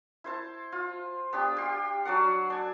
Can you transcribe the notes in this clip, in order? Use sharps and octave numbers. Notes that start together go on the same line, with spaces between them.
E4 C5 A5
F4
B3 D4 G4
G4 C6
F#3 D4 D5 F#5
D4 G#5